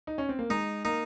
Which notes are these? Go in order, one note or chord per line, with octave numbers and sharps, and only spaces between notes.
D#4
C#4
C4
A#3
G#3 D#4
A#3 D#4